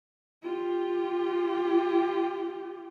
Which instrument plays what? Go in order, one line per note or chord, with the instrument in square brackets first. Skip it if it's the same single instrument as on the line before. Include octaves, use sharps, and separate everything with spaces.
[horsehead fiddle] F4 G4